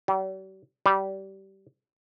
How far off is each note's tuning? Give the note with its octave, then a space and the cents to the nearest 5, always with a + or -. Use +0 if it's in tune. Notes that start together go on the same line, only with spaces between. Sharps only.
G3 -45
G3 -20